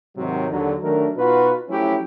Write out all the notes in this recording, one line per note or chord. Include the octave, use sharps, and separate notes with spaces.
G#2 C3 D#3 F#3
D#2 D3 F#3
D#3 F#3 A3 D4 A#4
B2 D#4 F4 F#4 B4
F3 F#3 A3 C#4 E4 G4